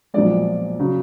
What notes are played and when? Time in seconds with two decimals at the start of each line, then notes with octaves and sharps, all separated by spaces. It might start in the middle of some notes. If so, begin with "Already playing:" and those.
0.14 B1 A#2 F3 G#3 D5
0.79 C#3 F#3